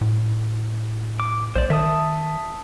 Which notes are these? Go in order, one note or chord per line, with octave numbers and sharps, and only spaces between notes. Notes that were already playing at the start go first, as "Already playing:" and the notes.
A2
D6
B1 C5 D5
D#3 E5 A5 D#6